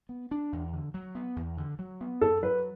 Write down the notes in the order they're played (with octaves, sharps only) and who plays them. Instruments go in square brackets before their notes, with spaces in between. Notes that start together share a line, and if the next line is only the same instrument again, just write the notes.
[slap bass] B3
D4
E2
D3
F#3
B3
E2
D3
F#3
B3
[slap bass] F#2 [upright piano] A4
[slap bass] F#3 [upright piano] B4